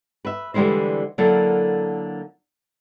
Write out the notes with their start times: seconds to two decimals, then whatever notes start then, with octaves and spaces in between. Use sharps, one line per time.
0.25 B4 E5
0.54 D3 E3 G3 G#3 E4 C5
1.18 D3 F#3 A#3 E4 A4 A#4